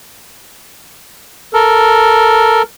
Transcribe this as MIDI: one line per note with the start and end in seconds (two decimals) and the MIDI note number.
1.54 2.62 69
1.54 2.62 70